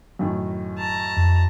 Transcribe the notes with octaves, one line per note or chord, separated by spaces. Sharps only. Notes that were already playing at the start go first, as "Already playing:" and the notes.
F#2 A2 D#3
A5 A#5
F2